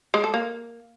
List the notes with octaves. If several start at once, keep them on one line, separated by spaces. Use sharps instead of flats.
G#3
A4
A#3